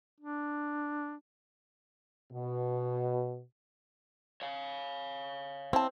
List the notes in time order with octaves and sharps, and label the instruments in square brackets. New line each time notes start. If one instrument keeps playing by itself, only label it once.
[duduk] D4
[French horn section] B2
[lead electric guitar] C#5 F5
[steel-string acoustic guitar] C4 [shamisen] E4 A5